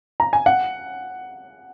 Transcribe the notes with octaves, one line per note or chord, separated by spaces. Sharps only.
A#5
G#5
F#5